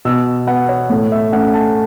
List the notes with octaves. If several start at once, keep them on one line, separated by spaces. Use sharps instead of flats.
B2 E6
B3 F#5
C#5
A2 A4
E5
A3 C#4 F#5
A5